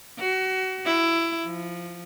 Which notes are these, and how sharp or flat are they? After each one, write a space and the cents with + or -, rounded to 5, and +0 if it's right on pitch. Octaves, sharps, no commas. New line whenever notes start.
F#4 +30
E4 +15
F3 -5